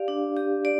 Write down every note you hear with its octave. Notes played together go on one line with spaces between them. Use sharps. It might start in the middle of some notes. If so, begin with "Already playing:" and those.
Already playing: G4 D5 F5
D4
G4
D5